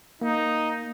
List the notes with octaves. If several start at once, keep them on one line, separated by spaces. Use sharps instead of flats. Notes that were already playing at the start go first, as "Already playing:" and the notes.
A#3 D#4